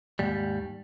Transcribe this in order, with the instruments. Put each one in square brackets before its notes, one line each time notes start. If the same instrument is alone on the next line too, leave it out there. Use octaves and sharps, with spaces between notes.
[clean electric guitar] D#2 G#2 G3